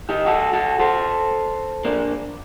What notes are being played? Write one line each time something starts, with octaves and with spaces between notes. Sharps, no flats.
D#4 G4
F#4 A4
F#4 A4
A4 C5
A#3 D4